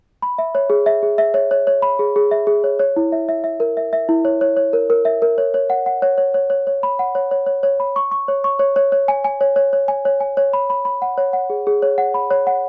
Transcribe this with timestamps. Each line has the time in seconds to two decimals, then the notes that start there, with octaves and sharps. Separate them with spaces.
0.22 B5
0.38 E5
0.55 C#5
0.70 G#4
0.86 E5
1.03 G#4
1.18 E5
1.34 C#5
1.51 C#5
1.67 C#5
1.82 B5
1.99 G#4
2.16 G#4
2.31 E5
2.47 G#4
2.64 C#5
2.79 C#5
2.96 E4
3.12 E5
3.29 E5
3.44 E5
3.60 A#4
3.77 E5
3.93 E5
4.09 E4
4.25 C#5
4.41 C#5
4.57 C#5
4.73 A#4
4.90 A#4
5.05 E5
5.22 A#4
5.38 C#5
5.54 C#5
5.70 F#5
5.86 F#5
6.02 C#5
6.18 C#5
6.34 C#5
6.50 C#5
6.67 C#5
6.83 B5
6.99 F#5
7.15 C#5
7.31 C#5
7.46 C#5
7.63 C#5
7.80 B5
7.96 C#6
8.11 C#6
8.28 C#5
8.44 C#6
8.59 C#5
8.76 C#5
8.92 C#5
9.08 G#5
9.24 G#5
9.41 C#5
9.56 C#5
9.73 C#5
9.88 G#5
10.05 C#5
10.20 G#5
10.37 C#5
10.53 B5
10.70 B5
10.85 B5
11.02 F#5
11.18 C#5
11.33 F#5
11.50 G#4
11.67 G#4
11.82 C#5
11.98 F#5
12.14 B5
12.31 C#5
12.47 F#5